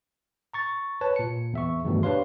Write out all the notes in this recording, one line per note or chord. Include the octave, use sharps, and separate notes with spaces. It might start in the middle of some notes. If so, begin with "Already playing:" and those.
A#5 C#6 A6
B4 C#5 A5
A#2 C#7
E2 E5 C#6
E2 G2 B2 D#3 A3
D4 G4 B4 C#5 F5 C6